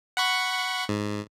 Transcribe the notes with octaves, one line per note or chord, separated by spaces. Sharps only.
F#5 B5 C#6
G#2